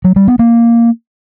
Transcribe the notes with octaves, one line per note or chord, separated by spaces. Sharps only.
F#3
G3
B3
A#3